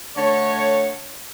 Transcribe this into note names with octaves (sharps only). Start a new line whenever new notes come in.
D3 A3 C#5